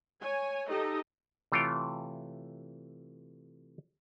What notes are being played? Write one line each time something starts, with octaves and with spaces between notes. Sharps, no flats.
C#5 G#5
D#4 G4 A4 D#5
C3 E3 A3 F4 C#5 G5